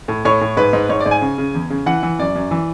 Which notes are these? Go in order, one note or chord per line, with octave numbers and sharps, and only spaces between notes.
A2
A2 C#5
A2
G#2 B4
G#2
G#2 C#5
D5
G#2
G#5
C#3
C#3
E2
C#3
E3 F#5
E3
F#2 D5
F#2
E3